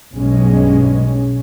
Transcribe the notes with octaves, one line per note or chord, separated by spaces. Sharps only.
B1 G2 G#3 C#4